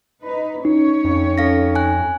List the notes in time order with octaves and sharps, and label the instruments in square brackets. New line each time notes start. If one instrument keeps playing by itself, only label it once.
[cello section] D#4 B4
[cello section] C#4 C#5 [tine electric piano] D#4
[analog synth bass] F2
[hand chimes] A4 F5 A#6
G#5 F#6